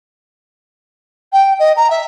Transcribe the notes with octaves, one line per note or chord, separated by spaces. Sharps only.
G5
D#5
A#5
E5